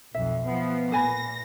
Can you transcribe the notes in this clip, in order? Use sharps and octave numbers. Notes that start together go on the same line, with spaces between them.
B1 F2 E5
F3 B3
A#2 B4 G#5 B5 A#6